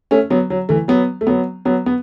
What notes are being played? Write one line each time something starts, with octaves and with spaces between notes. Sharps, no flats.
A3 C#4
F#3 B3
F#3
E3 A3
F#3 B3
A3
F#3 B3
F#3 B3
B3